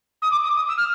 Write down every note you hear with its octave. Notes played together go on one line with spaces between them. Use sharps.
D#6
D6
D#6
D#6
E6
F6